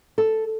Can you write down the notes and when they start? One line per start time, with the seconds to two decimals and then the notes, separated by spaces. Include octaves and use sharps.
0.18 A4